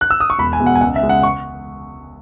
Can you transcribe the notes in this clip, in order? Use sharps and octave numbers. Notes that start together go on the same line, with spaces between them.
F#6
E6
D#6
C#6
E1 B5
G#5
E2 B2 G#3
F#5
G#5
C#2 F#5
E5
C#3 G#3
F#5
C#6